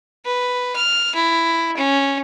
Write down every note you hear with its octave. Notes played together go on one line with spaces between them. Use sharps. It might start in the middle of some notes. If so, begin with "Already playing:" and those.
B4
F6
E4
C#4